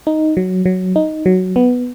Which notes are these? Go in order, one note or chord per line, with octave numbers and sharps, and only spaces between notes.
D#4
F#3
F#3
D#4
F#3
B3